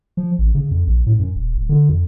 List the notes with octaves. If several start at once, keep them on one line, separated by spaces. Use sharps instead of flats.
F3
A1
C#3
F2
A#1
A2
F#2
D#1
D1
D3
F2